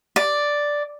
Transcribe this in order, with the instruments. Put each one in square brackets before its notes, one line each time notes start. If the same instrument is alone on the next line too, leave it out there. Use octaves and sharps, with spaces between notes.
[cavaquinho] D5